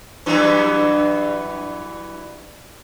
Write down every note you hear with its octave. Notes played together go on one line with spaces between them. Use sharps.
G2 E3 F#3